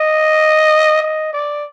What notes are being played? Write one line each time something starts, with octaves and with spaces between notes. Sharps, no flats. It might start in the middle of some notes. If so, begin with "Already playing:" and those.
Already playing: D#5
D#5
D5